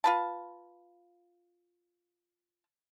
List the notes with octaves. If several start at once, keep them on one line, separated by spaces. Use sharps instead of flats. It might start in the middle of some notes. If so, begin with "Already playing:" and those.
F4 B4 A5